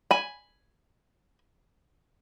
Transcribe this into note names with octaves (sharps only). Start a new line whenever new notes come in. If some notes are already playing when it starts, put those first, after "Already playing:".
G#5 B5